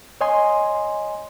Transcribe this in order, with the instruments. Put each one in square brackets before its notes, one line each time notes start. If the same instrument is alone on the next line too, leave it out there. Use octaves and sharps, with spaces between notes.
[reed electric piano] C#5 D#5 G#5 C6